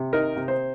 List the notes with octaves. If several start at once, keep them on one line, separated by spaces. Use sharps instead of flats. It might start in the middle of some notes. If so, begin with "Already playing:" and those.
Already playing: C3
D#4 A#4
C3
C5